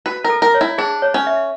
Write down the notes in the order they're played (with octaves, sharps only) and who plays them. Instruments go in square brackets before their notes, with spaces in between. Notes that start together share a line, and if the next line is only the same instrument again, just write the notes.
[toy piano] F#4 [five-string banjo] B4
[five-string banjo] A#4
[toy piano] A4
[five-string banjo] A#4
[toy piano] C#5
[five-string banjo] E4
[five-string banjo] D4 [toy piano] G#4
[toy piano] C#5
[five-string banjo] C#4
[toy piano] E5